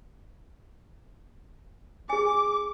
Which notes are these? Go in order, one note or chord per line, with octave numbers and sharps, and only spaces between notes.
G#4 G#5 D6